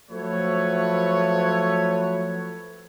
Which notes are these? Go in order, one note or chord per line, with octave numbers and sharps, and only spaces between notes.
F3 F#3 A3 A4 B4 C#5